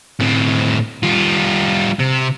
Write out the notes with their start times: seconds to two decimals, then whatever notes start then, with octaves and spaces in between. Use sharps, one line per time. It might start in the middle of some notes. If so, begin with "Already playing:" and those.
0.20 A2 C4
1.03 G3 F4
1.99 C3